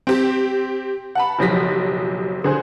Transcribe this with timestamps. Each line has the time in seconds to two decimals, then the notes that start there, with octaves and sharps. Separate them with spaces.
0.07 C4 G4
1.15 F#5 A5 B5
1.39 F#1 B1 F3 G4 A#6 B6
2.44 D3 G#4 C5